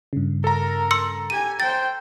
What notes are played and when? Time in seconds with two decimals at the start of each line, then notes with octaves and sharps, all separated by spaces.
0.13 G2 C#3
0.44 A4 A#4 A#5
0.91 C6 E6 C#7
1.30 G4 G#5 D#7
1.60 C5 G5 A6